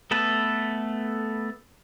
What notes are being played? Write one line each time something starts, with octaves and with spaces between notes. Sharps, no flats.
A3 B3 A4 B4